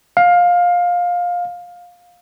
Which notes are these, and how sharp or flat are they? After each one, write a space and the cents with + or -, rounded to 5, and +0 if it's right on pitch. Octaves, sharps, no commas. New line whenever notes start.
F5 +15